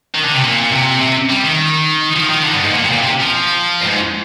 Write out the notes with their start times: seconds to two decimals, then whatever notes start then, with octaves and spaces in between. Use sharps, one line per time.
0.15 D#3
0.25 D3
0.34 C3
0.44 A#2
0.72 C3
1.01 C3
1.29 G3
1.44 D#3
2.16 F3
2.29 D#3
2.44 D3
2.54 G2
2.63 G#2
2.73 A#2
2.85 C3
2.92 A#2
3.01 C3
3.20 F3
3.81 G2
3.87 G#2